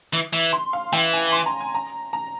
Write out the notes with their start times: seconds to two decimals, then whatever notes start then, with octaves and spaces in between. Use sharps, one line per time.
0.13 E3
0.33 E3
0.53 C6
0.73 F5
0.93 E3 G5
1.13 G#5
1.32 C6
1.46 A#5
1.60 G#5
1.75 A#5
2.13 A#5